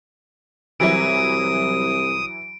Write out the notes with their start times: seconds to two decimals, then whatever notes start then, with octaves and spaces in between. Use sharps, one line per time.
0.80 C2 E3 F#3 E4 D#6 D7